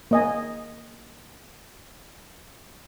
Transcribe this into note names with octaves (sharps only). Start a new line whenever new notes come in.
A#3 D#5 G#5